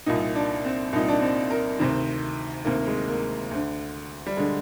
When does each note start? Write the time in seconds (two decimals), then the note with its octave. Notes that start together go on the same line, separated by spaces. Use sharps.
0.06 C2 A#2 D#4
0.35 D4
0.65 C4
0.93 C2 A#2 D#4
1.08 D4
1.21 C4
1.50 A#4
1.79 D2 C3 D#3 C4
2.65 D2 C3 D#3 A#3
2.87 G#3
3.09 A#3
3.51 D2 D3
4.26 G3
4.37 G#3
4.40 D3